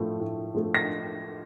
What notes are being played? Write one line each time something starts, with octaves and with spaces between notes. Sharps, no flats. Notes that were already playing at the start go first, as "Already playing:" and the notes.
Already playing: A2 F3 A3
A2
F3 A3
A#6